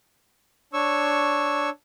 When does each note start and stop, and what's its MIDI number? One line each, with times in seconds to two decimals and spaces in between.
0.73 1.70 62
0.73 1.70 73
0.73 1.70 85
0.73 1.70 88